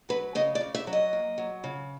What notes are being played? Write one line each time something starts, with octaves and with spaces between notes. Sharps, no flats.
F#3 B4
C#3 D#5
D5
C#3
E5
F#3
D#5
A#3
F#3
C#3